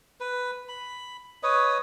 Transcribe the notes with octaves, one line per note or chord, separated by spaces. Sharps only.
B4
B5
B4 C#5 D#5